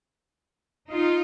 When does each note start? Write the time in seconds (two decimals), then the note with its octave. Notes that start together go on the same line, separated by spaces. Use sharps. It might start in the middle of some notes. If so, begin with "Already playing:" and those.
0.92 D#4 F4